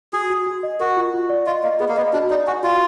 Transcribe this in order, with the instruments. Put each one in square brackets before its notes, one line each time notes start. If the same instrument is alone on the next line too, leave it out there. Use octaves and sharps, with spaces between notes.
[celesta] F#4 [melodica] G#4
[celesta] F#4
F#4
D#5
[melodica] F#4 [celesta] A#4
[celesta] F4
F4
D5
[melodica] F4 [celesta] D#5
[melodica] A#3 [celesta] D#5
[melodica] B3 [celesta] G#4
[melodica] A#3
[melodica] B3 [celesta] D#5
[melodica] D4 [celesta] F#4
[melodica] D#4 [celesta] D5
[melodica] F#4 [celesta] G#5
[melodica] F4 [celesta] F#4